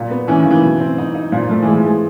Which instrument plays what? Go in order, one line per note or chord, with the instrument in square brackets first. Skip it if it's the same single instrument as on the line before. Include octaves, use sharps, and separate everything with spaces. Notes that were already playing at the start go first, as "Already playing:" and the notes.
Already playing: [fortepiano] A#2
B3
[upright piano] E3 [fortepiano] C#4
[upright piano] D#3
[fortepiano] C#3
[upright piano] E3
[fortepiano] B2
C4
D#4
D#4
[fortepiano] A#2 [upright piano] F3
[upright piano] F3 [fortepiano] A3
[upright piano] E3 [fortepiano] G#3
[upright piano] F3
[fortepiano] G#3